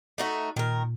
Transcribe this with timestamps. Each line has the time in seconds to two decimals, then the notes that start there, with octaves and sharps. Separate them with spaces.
0.18 A3 D#4 F#4
0.56 A#2 D#3 A#4